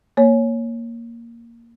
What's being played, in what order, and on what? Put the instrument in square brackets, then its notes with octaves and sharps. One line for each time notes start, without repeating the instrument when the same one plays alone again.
[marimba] A#3 C#5